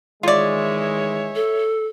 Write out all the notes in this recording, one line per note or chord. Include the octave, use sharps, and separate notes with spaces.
D#3 E3 G#3 F4 C#5 D5 E5
A4